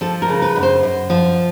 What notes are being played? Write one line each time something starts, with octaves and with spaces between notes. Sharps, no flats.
F3 A4
A#4
C#3
B4
F#2
C5
F#2
F3